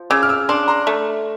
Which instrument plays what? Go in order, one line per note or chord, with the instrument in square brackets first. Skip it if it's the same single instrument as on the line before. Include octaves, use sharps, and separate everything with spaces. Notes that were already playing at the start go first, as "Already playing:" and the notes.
Already playing: [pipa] F3
[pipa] C#3 [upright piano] D6 E6
[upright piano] F6
D6 E6
[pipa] D4 [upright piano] C6 D6
[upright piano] A#5 C6
[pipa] A3